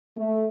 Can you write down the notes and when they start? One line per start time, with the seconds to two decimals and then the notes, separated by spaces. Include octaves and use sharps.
0.17 A3